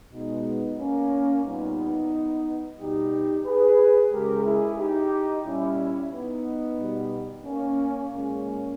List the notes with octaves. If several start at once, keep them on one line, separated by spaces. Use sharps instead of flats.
B2 G#3 B3 D#4
A#3 C#4
A#2 G3 B3 D#4
B2 G3 D#4 G4
G#4 B4
C#3 G#3 G4 A#4
E4 G#4
D#4 G4
A#2 G3 C#4 E4
B3 D#4
B2 G3
A#3 C#4
A#2 G#3 A#3 C#4